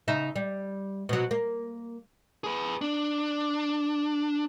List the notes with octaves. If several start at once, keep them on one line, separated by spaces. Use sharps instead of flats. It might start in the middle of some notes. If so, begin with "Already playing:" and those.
C#3 D#4 E5
G3
B2 F#3
A#3
G#4 B4
D4